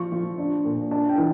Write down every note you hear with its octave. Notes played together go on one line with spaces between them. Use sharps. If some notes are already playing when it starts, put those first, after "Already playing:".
Already playing: F3 C#6
F3
D4
A#2
D4 A5
G5
E3